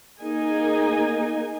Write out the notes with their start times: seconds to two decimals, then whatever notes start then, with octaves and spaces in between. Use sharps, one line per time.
0.20 A#3 D#4 G#4 G#5